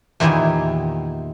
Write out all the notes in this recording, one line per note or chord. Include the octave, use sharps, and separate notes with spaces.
E2 A#2 D#3 E4 G4 G#5